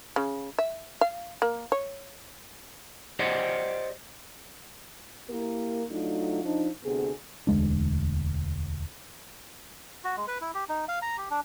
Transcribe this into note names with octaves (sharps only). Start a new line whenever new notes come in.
C#3
E5
F5
A#3
C#5
G4 C5 D5 D#5 F#5
A#3 E4 G4 A#4
F#3 A3 D4 D#4 F4
F3 D4 D#4
D2 C3 B3 G#4
E1 D2 G#3 D4
F#4
G#3
B4
E4
G4
D#4
F5
A#5
G4
D4